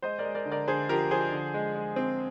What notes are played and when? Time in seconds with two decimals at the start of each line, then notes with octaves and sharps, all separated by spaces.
0.02 G#3 C5 D#5
0.19 A#4 D5
0.25 G#3
0.35 A#4 D5
0.46 D3
0.51 A#4 D5
0.67 D3 G#4 C5
0.89 F3 G4 A#4
1.11 F3 G#4 C5
1.32 D3
1.54 G#3
1.75 G#3
1.96 C4